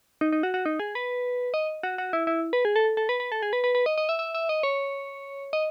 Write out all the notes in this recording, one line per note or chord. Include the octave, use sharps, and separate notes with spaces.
D#4
D#4
F#4
F#4
D#4
G#4
B4
D#5
F#4
F#4
E4
E4
B4
G#4
A4
A4
B4
B4
A4
G#4
B4
B4
B4
D#5
D#5
E5
E5
E5
D#5
C#5
D#5